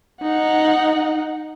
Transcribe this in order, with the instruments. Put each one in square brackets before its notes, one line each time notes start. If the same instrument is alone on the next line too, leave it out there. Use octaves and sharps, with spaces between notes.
[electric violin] D#4 F#5